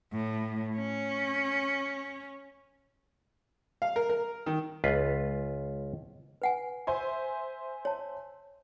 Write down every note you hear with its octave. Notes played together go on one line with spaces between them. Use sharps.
A2
C#4
F5
A#4
A#4
D#3
C#2 F4 B4
B4 F#5 G#5
C5 E5 G#5 C#6
C#5 A5